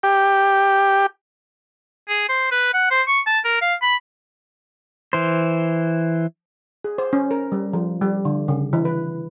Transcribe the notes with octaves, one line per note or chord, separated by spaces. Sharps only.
G4
G#4
C5
B4
F#5
C5
C#6
A5
A#4
F5
B5
E3 C5
G#4
C5
C#4
A#4
G3
F3
G3
D3
C#3
E3
B4